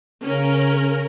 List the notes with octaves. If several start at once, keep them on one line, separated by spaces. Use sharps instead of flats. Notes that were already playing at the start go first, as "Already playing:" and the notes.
C#3 C#4 A#4